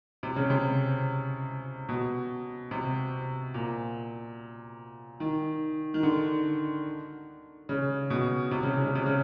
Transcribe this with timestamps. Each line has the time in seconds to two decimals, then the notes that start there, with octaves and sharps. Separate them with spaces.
0.23 C3
0.36 C#3
0.50 C3
1.89 B2
2.71 C3
3.54 A#2
5.20 D#3
5.94 D#3
6.03 D3
7.69 C#3
8.10 B2
8.51 C3
8.63 C#3
8.74 C3
8.84 C#3
8.95 C3
9.06 C#3